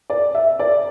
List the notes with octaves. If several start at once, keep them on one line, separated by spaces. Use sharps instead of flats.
D5
E5
D5